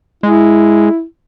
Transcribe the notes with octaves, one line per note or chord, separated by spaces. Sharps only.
G#3 E4